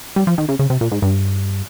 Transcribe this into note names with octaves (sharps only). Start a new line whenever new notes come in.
G3
F3
D#3
C#3
C#3
C3
A#2
G#2
G2